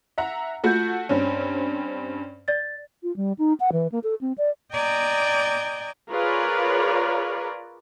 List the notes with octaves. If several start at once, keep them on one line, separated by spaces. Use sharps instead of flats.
E5 F#5 A#5
A3 F4 F#4 G6
G2 C4 C#4 C#5
D5 A6
F4
G3
D#4
F#5
E3
A#3
A4
C4
D5
D5 D#5 G5 G#5 A#5
F4 G#4 A#4 B4 C#5 D5